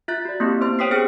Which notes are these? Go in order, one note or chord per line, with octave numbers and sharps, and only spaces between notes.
F4 E5 F#6 A6
F#4 D5
A#3 C4 E4 G4
B3 C5 C6
C5 C#5 G5 D#6 B6 C7
B3 C#4 G4 G#4 G5 F6